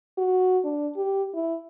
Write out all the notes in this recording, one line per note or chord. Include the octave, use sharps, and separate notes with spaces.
F#4
D4
G4
E4